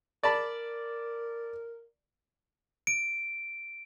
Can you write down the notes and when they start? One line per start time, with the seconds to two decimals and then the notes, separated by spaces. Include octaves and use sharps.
0.23 A#4 D5 A5 B5
2.87 D7